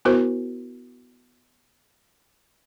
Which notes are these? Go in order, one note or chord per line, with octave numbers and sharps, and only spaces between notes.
B3 E4 F#4 A#4 C5